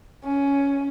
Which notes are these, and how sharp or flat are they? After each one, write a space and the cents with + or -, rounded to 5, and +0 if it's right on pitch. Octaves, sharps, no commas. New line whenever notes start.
C#4 +10